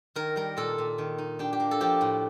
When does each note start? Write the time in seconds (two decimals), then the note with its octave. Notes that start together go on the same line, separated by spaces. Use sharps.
0.15 D#3 A#4
0.36 G3 A#4
0.57 A#2 A4
0.78 A#2
0.98 D#3
1.18 D#4
1.39 D4 G4
1.53 G4
1.60 A#3
1.71 A4
1.80 F3 G4
2.01 A2